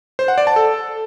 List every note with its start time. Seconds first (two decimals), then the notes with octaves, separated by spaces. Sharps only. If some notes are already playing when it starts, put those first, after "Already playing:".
0.19 C5
0.28 F#5
0.38 D5
0.47 A5
0.56 A4